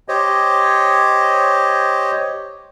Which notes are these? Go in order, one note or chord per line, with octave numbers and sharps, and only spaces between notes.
G4 C5 C#5 D#5